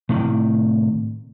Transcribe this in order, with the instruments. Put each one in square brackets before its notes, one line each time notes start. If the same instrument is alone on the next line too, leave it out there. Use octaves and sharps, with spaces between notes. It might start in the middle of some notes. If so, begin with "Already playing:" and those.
[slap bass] A2 C3 D#3